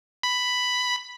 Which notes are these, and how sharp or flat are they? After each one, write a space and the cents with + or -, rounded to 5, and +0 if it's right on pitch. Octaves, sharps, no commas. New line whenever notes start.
B5 +5